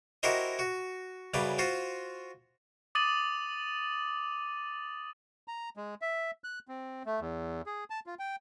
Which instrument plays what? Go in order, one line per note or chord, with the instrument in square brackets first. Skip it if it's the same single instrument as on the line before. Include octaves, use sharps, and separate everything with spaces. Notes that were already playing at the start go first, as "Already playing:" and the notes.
[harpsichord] E4 F#4 G4 A#4 C5 D#5
F#4
F#2 C#3 G3 G4 B4
F4 F#4 C5
[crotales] D6 D#6 A6 D#7 F#7
[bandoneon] A#5
G#3
E5
F#6
C4
A3
E2
G#4
A5
F4
G5